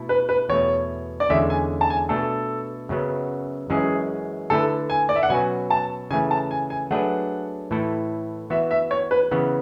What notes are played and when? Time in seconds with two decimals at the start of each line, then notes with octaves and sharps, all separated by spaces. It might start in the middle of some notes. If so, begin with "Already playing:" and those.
Already playing: B2 A3 E4 A4
0.09 B4
0.29 B4
0.49 E2 B2 A3 C#5
1.20 D5
1.30 E2 D3 G#3 C#4 E5
1.50 G#5
1.81 A5
1.90 G#5
2.09 B2 A3 D4 A4
2.89 F#2 C#3 F#3 B3
3.70 F#2 E3 G#3 C#4 G#4
4.50 D3 A3 E4 A4 B4
4.90 G#5
5.09 D5
5.16 E5
5.23 F#5
5.30 B2 F#3 C#4 F#4 B4 G#5
5.70 A5
6.11 C#3 E3 A3 G#5
6.31 A5
6.51 G#5
6.70 G#5
6.91 F#3 A3 D4 G#4 B4 F#5
7.71 A2 E3 A3 E4 A4
8.50 E3 B3 F#4 E5
8.71 E5
8.91 C#5
9.11 B4
9.31 C#3 E3 B3